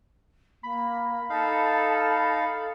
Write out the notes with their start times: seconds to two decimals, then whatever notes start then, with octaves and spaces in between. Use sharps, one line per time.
0.63 A#3 B5
1.30 D#4 A4 F5 A5